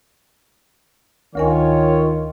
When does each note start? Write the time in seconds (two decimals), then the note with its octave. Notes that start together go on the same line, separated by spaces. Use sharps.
1.35 D2 D#3 F4 A#4 C#5 G#5